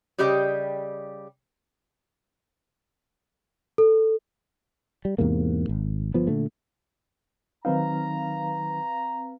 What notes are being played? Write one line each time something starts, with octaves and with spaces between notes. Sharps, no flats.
C#3 G3 G4 D#5 G5
A4
G3
E2 G#2 C3 A#3
G#1
G1 F3 B3
A#2 D3 A3
D#3 F#3 C4 D#4 B4 F5 A#5